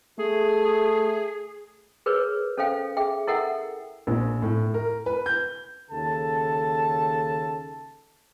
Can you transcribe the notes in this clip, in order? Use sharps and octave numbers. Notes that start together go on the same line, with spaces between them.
A3 G#4
G#4 A#4 B4 C#5
C#4 A4 C5 F5 G5
G#4 E5 G5
E4 A4 A#4 E5 F#5 G5
A#1
A2
A#4
B4
G6
D#2 C#3 A4 A5